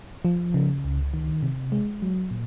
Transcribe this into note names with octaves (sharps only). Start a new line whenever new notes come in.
F3
C#3
C#2
D#3
C3
G#3
F#3
A#2